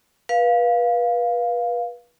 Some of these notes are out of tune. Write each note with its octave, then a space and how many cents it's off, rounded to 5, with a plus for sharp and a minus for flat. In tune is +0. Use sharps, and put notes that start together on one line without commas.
B4 -30 F5 +0